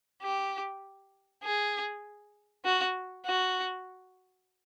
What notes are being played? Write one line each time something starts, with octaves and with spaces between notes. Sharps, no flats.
G4
G#4
F#4
F#4